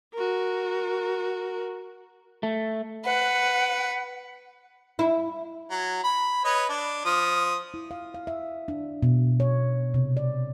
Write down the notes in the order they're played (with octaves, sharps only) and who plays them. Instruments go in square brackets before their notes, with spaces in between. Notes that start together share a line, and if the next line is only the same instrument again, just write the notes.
[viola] F#4 A#4
[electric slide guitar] A3
[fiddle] B4 [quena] F#5
[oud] E4
[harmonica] F#3
B5
B4 C#5 D#5
D4
F3 D#6
[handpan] E4
F5
F5
E5
D4
B2
C#5
C3
D5